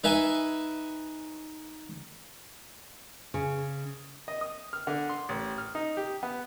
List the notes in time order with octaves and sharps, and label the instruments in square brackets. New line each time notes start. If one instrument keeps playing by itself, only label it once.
[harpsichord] D#4 B4 E5 G#5
[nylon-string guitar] C#3
[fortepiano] D#5
D#6
F6
D3
C6
A1
F6
D#4
G4
B3